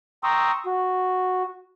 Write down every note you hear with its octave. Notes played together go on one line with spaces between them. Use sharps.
G5 A#5 C6 C#6 D#6 E6
F#4